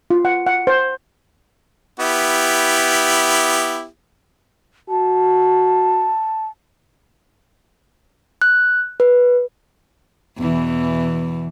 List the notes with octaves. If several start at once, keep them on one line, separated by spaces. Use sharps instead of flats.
F4
F#5
F#5
C5
B3 E4 G4
F#4 A5
F#6
B4
E2 B2 E3